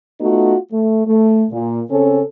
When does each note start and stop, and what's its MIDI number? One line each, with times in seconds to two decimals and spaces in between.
0.20 0.55 57
0.20 0.55 59
0.20 0.55 63
0.20 0.55 65
0.20 0.55 66
0.72 1.02 57
1.07 1.45 57
1.51 1.80 46
1.91 2.22 49
1.91 2.22 60
1.91 2.22 61
1.91 2.22 69